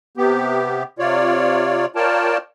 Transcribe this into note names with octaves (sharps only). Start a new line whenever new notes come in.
C3 B3 G4
C3 F4 C#5 D5
F4 A#4 C#5 D5 G5 A5